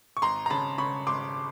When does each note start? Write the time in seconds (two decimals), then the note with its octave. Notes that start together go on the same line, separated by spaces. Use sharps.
0.17 C#6
0.22 G#1 A#5 C6
0.46 A#5
0.50 C#3 A5 B5
0.78 C#3 B5 C#6
1.07 G#1 C6 D6